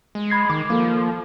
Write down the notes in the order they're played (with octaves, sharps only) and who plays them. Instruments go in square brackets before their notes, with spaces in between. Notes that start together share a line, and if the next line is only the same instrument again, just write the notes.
[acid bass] G#3
[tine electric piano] B5 G#6 C7
[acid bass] D#3 [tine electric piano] D6
[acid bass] F3 [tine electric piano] A#3 A4